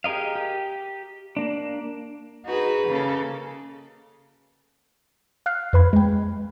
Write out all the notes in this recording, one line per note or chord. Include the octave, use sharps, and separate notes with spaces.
G4 G#4 A#4 D#5 F5
G4
A#3 D4
D#4 F#4 G#4 B4
C#3 A#3 G#4 A4
F5 F6 F#6 C7
F2 B4 B5 G#6
G#3 G5